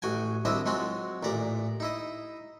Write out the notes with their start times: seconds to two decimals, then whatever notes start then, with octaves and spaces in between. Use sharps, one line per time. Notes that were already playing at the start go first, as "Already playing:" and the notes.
0.02 A1 F#4 G5 G#5
0.45 C2 C4 D4 E4 D#5 E5
0.66 F#3 G#3 C4 F4 F#4
1.23 A1 A#2 D5 A#5
1.80 D#4 E4 D#5